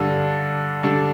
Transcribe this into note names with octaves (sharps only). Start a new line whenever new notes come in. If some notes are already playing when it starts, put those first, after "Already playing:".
Already playing: G2 D3 G3
D3 G3 D4